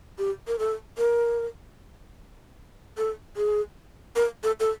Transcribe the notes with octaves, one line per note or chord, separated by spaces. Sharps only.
G4
A#4
A4
A#4
A4
G#4
A#4
A4
A4